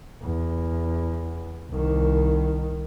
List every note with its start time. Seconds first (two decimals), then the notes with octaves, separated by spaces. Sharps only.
0.22 E2
1.69 C2 D#3